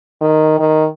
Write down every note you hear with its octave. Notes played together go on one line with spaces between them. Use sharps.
D#3
D#3